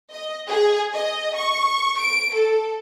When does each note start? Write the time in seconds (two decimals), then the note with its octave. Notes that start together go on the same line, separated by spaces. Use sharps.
0.11 D#5
0.49 G#4
0.94 D#5
1.36 C#6
1.99 D7
2.35 A4